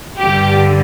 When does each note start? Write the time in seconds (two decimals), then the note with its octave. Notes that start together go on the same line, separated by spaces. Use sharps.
0.18 G2 D3 G3 G4